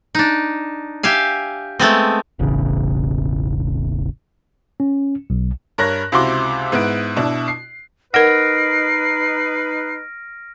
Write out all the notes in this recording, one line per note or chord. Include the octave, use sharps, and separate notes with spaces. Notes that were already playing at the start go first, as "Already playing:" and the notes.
D4 D#4
G4 E5 F5 G#5
G#3 A3 B3 C4
E1 A1 E2 C#3
C#4
B1
G2 A#4 C#5 F#6 A#6
C#2 C3 E4 F#4 C6 D6
G#2 B3 E4 F#6 D7
B2 D4 E4
C7
D#4 A#4 B4 F#5 F6 A#6 C7 D7